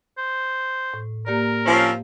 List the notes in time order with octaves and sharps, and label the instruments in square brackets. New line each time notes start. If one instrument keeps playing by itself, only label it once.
[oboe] C5
[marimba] A2
[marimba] A#3 G4 D5 [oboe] A#4
[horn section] F3 C4 C#4